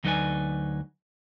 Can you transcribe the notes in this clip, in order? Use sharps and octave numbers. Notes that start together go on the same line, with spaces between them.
D2 F#3 D#4 B4 D5 G#5